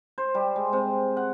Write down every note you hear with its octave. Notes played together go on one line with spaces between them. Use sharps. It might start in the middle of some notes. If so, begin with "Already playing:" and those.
C5
G3
G#3
C3
F#5